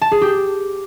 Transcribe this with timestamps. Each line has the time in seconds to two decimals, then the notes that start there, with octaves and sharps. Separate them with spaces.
0.02 A5
0.12 G#4
0.22 G4